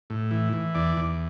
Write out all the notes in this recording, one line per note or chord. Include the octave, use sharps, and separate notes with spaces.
A2
E3
E3
E2 D5
E2